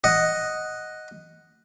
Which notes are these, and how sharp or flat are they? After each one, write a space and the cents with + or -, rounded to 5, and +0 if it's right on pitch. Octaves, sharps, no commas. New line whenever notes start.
D#5 +0 F#5 +0